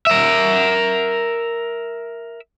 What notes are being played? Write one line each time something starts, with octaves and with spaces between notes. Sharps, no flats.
A#4 E5